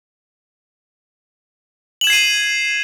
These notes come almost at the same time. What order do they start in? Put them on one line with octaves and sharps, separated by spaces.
F#7 E7 G#6 C7 D#7